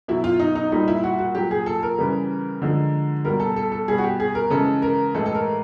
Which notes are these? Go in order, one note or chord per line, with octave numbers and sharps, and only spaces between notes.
B2 F#3 E4
F4
D#4
D#4
A#2 G3 D#4
E4
F#4
F#4
A#2 F#3 G4
G#4
A4
A#4
C#3 E3 G3
D3 F3 G#3
B2 G3 A#4
A4
A4
A4
B2 G3 G#4
F#4
G4
G#4
A#4
C#3 E3 G#3 A4
A#4
A2 E3 G#3 A4
A4
A#4